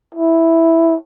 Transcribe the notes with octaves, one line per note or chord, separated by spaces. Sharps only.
E4